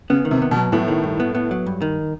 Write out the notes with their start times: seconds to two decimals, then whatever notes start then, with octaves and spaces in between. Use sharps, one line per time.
0.10 C#3 B3
0.25 D#3
0.31 C3
0.42 B3
0.51 B2
0.56 F#3
0.72 A2 B3
0.88 D#3
1.04 G2
1.20 B3
1.35 B3
1.51 F#3
1.66 G2
1.82 D#3